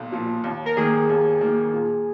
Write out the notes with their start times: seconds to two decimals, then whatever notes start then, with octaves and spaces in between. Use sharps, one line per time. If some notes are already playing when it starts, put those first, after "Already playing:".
Already playing: B1 A#2
0.12 A#2 F3
0.44 D#2
0.66 A#4
0.76 D#3 A#3 G#4
1.09 D#2
1.41 D#3 A#3
1.73 A#2